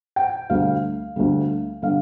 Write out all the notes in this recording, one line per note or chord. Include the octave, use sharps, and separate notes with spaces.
G5
D2 D3 G3 F5
D2 D3 G3
D3 G3 F5